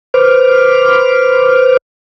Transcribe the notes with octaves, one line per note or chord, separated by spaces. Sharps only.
B4 C5 D6 F6